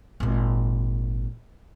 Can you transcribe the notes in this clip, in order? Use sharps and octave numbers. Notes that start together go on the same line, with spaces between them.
G#1 A#2